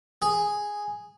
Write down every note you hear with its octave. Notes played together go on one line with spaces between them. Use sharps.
G#4